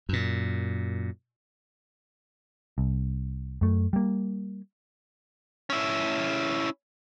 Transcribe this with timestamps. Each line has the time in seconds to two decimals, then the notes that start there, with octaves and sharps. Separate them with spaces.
0.09 F#2 A#2
2.78 C2
3.61 F#2 A3
3.93 G3 A#3
5.70 C#4 E4